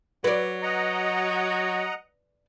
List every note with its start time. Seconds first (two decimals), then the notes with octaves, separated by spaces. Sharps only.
0.24 F#3 B4 D5
0.63 D#5 F#5 A#5